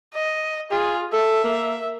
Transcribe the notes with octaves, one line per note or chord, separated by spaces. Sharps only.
D#5
F4 G#4
A4 E5
A#3